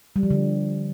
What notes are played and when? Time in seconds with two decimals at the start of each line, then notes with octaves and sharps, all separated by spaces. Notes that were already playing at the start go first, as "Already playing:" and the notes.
0.16 G3
0.23 F3
0.30 D3